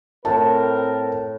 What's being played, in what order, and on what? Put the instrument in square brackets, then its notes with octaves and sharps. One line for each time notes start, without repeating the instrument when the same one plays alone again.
[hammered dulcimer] A2 [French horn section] C4 A#4 [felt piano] A5